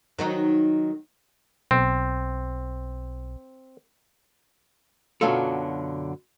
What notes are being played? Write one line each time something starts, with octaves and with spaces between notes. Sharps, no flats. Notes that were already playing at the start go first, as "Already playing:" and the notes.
D#3 F#3 D#4
B1 C4
F#2 B2 D3 F#3 F4 A4